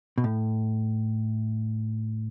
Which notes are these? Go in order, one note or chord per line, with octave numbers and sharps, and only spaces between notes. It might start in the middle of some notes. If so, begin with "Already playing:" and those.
B2
A2